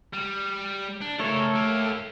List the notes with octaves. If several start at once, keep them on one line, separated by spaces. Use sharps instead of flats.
G3
D4
C#3 A3 A4 A#4 C#5
A#3 G4